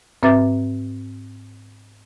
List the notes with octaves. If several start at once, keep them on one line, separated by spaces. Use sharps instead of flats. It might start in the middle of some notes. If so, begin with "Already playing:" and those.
G#2 C4 B4 E5 D6 A6